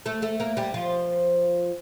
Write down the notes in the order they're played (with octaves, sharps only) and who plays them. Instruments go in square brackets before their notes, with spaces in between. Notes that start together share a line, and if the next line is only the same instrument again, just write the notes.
[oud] A3 A4
A3 A4
A#3 A#4
G3 G4
F3 F4